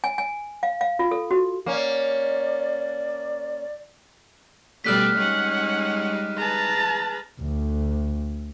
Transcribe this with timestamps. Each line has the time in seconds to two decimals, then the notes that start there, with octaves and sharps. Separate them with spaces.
0.04 G#5
0.18 G#5
0.63 F5
0.81 F5
0.99 F4
1.11 A4
1.31 F#4
1.66 A#3 C#4 D5
4.84 B2 G3 A3 A4 D5 F6 F#6 B6
5.17 G3 G#3 C#4 D#4 F#5
6.37 G#4 B4 A5 A#5
7.41 D2